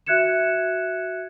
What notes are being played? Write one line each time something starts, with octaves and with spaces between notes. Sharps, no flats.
F#4 E5 F#6 G#6 C#7 E7